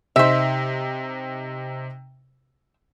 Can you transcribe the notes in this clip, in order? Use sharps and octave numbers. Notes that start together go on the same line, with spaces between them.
C3 D#4 C5 E5